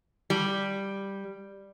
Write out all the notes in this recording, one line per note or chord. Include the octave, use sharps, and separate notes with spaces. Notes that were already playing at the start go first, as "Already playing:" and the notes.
G3